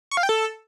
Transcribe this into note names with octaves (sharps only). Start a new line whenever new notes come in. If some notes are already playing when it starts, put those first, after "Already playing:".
C#6
F5
G5
A4